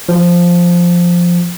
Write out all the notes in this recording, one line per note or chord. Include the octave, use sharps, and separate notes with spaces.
F3